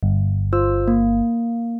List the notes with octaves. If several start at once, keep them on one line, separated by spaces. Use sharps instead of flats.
G1
F4 C5 E6
A#3